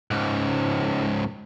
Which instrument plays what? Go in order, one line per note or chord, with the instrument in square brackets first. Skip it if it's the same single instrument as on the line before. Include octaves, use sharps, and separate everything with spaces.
[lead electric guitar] C#2 G#2